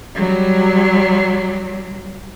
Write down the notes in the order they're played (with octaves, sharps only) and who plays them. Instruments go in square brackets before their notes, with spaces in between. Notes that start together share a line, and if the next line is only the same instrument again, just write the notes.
[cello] F#3 G3